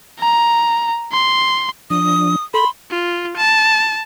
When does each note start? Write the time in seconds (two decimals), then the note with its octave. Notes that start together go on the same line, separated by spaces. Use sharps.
0.19 A#5
1.12 C6
1.90 F3 D4 D#6
2.54 A4 B5 C6
2.90 F4
3.37 A5